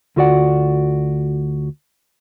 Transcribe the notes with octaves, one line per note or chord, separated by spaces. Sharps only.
D2 F4 F#4 D5 F#5